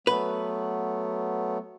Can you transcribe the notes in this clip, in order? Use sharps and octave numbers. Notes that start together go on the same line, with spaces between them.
F#3 A3 B3 B4